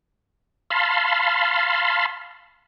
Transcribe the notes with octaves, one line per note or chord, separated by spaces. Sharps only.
F5 A5 B5 C6